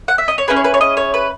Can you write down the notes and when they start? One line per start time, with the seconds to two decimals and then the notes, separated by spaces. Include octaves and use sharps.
0.08 F#5
0.18 E5
0.28 D#5
0.38 C#5
0.48 C#4 E4 G#4 B4
0.56 C#5
0.64 B4
0.74 C#5
0.81 D#5
0.97 C#5
1.14 B4